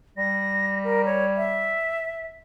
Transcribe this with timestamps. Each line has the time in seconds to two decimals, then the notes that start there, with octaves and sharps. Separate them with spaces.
0.18 G3 A#6
0.84 A#4
1.05 C#5
1.37 E5